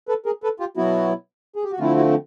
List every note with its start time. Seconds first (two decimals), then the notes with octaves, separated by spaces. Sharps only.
0.09 A4 B4
0.26 G#4 A#4
0.43 A4 B4
0.60 F4 G4
0.77 B2 F#3 B3 E4 F#4
1.56 G#4
1.64 G4
1.71 F#4
1.79 D3 F3 A3 C4 E4 F4
1.96 E4 F#4